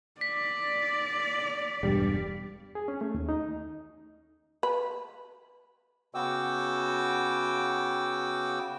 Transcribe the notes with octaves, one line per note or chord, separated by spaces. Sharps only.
D5 B6
E1 G2 G3
G#4
C#4
A3
D#2
D#4
B4
C#3 B3 F#4 G5 D6 E6